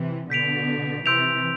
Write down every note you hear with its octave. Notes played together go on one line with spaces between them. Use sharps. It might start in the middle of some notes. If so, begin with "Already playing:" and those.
Already playing: C3 E3
B2 D3 G6 B6 D7 F7
C3 E3 C6 E6 G6 D7 F7